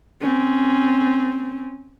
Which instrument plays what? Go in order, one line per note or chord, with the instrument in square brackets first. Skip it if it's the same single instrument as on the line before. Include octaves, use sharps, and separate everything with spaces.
[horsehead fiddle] C4 C#4